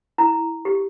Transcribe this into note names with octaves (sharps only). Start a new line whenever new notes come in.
E4 A#5
G4